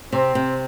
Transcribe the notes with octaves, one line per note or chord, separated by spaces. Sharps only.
C3 C4
C3